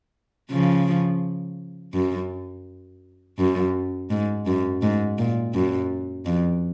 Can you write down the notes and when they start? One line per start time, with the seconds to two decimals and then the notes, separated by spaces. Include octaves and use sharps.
0.51 C#3 F3
1.94 F#2
3.39 F#2
4.10 G#2
4.46 F#2
4.82 G#2
5.19 A#2
5.55 F#2
6.26 F2